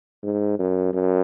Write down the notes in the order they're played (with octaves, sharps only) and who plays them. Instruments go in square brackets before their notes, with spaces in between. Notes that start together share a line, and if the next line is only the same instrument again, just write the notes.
[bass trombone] G#2
F#2
F#2